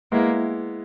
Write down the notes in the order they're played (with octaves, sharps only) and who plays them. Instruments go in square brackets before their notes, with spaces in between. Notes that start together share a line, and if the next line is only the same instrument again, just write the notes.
[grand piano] G#3 B3 E4 [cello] A#3